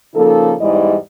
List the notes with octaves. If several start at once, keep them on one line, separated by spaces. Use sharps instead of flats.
C#3 F3 A#3 D#4 A4
E2 G#2 G3 E4 D5 D#5